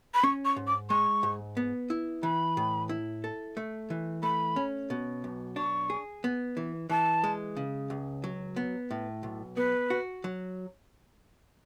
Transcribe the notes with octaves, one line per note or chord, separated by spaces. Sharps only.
B5
C#4 C#6
C#6
G#2
D6
G#3 C#6
G#2
B3
E4
E3 B5
A2
E4
A4
A3
E3
A3 B5
C#4
B2
B1
D4 C#6
G#4
B3
E3
E3 A5
G#3
C#3
C#2
F#3
B3
A2
B1
B3 B4
F#4
F#3